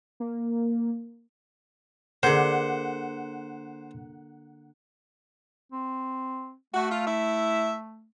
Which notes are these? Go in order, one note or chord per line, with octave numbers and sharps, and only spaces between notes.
A#3
D3 A#3 G#4 C5 F#5 G6
C4
A3 F#4
F4
E4 E5